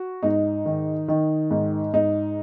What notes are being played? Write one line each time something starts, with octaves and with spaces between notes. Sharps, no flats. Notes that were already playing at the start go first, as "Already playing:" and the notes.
Already playing: F#4
G#2 D#4
D#3
D#3
G#2
G#2 D#4